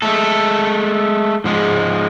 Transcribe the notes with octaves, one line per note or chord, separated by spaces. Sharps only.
G#3 A3 A4
G#2 F3 G#3